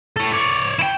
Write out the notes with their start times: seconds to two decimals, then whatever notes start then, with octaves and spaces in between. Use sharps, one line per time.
0.17 A4 C#5
0.32 C#5 D5
0.79 E4 G5